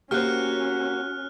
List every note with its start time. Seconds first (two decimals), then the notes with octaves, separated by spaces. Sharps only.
0.11 A#3 C#4 F#4 G4 C5 F6 F#6